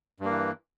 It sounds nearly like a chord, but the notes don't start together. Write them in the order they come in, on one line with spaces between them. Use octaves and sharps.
G2 A#3 E3